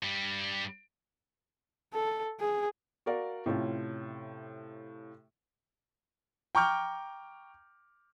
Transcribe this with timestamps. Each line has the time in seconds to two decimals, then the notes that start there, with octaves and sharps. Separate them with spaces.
0.03 G2 G3
1.94 A4
2.40 G#4
3.06 F#4 A#4 D5 F5
3.46 A2 C3 A3 C#4 F4
6.55 G5 A#5 C#6 D6 F6 G6